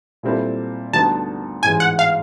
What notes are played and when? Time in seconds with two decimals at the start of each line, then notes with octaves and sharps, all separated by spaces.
0.23 A#2 G3 C4 E4 A4
0.93 D2 D3 G3 B3 D#4 A5
1.63 A1 G#2 E3 G#3 G#5
1.80 F#5
1.99 F5